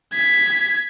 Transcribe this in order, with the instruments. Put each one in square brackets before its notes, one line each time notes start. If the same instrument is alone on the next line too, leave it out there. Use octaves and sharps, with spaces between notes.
[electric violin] G#6 B6